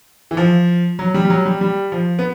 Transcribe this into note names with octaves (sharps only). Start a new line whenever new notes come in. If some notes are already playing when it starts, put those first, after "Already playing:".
E3
F3
F#3
G3
G3
F#3
G3
G3
F3
B3